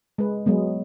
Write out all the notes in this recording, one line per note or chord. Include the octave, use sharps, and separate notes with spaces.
G#3 B4
F#3 G#3 B3